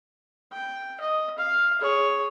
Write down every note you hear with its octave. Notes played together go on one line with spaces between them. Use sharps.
G5
D#5
F5
G#4 C#5